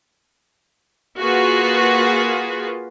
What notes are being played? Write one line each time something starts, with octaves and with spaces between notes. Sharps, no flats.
A#3 F4 F#4 G#4 B4